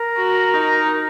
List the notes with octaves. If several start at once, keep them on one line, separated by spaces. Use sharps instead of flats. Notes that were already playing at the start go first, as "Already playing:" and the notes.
Already playing: A#4
F#4
D#4